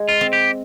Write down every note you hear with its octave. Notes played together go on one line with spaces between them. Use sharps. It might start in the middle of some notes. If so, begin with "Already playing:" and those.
Already playing: G#3
F4
C4
G4